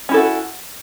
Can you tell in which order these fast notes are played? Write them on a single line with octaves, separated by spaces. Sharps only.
C#4 E4 A4 F#4